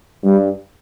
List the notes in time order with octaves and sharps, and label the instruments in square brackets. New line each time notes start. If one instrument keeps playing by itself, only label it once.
[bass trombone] G2 [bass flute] G3